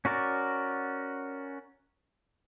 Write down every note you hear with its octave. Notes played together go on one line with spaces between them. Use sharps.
C#4 F#4 A#4 D5